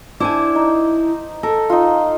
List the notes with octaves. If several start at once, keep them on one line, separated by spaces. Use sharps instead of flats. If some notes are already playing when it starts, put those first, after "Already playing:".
D4 E4 C5 D5 G#5
D#4
A4 A#4
D#4 F4